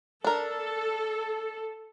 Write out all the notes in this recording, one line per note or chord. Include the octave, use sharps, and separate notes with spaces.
D4 A4 A#4